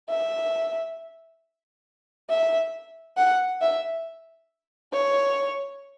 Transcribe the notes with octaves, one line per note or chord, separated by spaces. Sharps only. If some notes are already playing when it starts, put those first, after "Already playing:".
E5
E5
F#5
E5
C#5